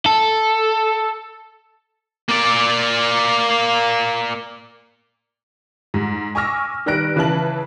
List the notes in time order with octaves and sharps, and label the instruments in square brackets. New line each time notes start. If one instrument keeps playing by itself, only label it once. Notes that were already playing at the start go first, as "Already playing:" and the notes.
[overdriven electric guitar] A4
[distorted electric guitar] A#3 D5
[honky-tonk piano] G#2
G#5 C#6 D6 E6 F6 A#6
D#3 G3 B4 F#6 A#6 D7
C#3 E3 E4 B4 A5 F#7